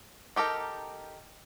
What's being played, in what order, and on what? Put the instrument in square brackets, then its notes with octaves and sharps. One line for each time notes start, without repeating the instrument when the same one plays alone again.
[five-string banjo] D#4 G4 A4 A#4